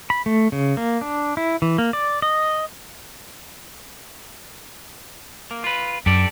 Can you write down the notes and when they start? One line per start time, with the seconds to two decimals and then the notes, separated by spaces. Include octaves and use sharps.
0.10 B5
0.26 A3
0.52 C#3
0.77 A#3
1.01 D4
1.37 E4
1.62 E3
1.78 A#3
1.93 D5
2.22 D#5
5.51 A#3
5.64 F4 B4
6.06 F#2 G4 A4 D5